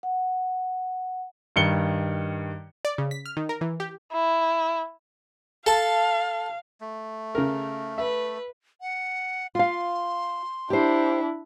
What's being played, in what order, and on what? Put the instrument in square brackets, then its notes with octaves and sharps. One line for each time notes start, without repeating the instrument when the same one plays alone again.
[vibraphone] F#5
[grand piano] G2 D#3 C#7 G7
[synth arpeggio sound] D5
C#3
B6
F6
D#3
A#4
E3
G4
[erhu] E4
[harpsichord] A4 A5 [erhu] F5
[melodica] A3
[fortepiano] C#3 A#4
[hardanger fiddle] B4 [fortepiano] E5
[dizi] F#5
[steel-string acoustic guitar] F4 F5 [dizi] C6
[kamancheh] D4 E4 [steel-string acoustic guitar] G4 C5